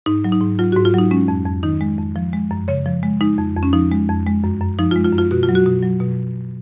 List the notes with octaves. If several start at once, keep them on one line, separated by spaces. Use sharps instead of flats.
G#2 D#4
F#3
D#4
G#2
F#3 F4
G#2 F#4
F4
F#3 D#4
G#3 C#4
F2
F2
D#3 D#4
G#3
F2
F3
G#3
F#2
C#3 C#5
F3
G#3
G#3 D#4
F2
F2
C#4
F3 D#4
G#3
F2
G#3
F#2
F#2
F3 D#4
F4
G#3
F4
F#2
F4
B2 F#4
F4
F#3
F#4
B2
F#3
B2